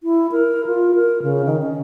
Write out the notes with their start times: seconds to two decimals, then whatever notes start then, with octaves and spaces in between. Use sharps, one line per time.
0.03 E4
0.32 A#4
0.66 F4
0.95 A#4
1.22 C#3
1.46 D#3
1.62 C#4